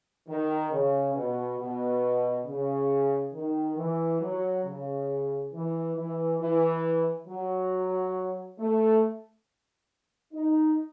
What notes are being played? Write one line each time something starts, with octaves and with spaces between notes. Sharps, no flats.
D#3
C#3
B2
B2
C#3
D#3
E3
F#3
C#3
E3
E3
E3
F#3
A3
D#4